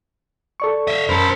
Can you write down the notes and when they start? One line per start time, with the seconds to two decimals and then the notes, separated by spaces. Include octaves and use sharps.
0.60 A4 D5 C#6
0.87 D#5 E5
1.09 F#2 A#4 C5 A5 B5